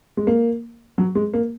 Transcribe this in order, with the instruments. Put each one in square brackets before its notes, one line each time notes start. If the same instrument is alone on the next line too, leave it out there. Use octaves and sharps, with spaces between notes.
[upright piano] G#3
A#3
F#3
G#3
A#3